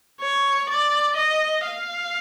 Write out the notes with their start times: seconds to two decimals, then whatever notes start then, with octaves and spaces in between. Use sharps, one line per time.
0.21 C#5
0.70 D5
1.17 D#5
1.66 F5